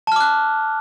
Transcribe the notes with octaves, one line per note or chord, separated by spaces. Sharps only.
A5 D6 F6 F#6